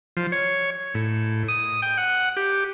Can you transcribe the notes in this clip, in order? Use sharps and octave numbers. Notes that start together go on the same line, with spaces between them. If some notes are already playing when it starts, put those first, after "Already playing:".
F3
C#5
A2
D#6
G5
F#5
G4